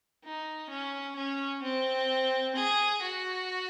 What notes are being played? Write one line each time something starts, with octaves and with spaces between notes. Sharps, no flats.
D#4
C#4
C#4
C4
G#4
F#4